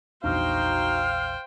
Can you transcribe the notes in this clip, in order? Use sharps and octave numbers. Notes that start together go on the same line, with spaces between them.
A#1 E2 D4 D#4 F#4 C5 F5 G5